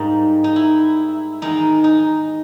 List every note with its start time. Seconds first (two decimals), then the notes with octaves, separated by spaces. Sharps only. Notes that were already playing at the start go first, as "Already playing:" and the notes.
Already playing: G#2 G3 A#3 D#4
0.44 D#4
0.56 E4
1.42 E2 D#3 G#3 D#4
1.84 D#4